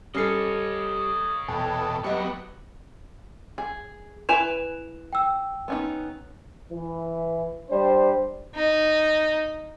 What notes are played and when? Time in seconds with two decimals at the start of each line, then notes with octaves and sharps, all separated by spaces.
0.15 G3 C#4 A4 C#5 D#5 C7
1.48 E2 B2 A4 G5
2.04 F#3 G3 B3 C4 D#5 F#5
3.58 G#4
4.29 E4 B4 G#5 E7 F7
5.13 G5 E6
5.68 B3 C#4 D#4
6.71 E3
7.70 G3 D4 C5
8.55 D#4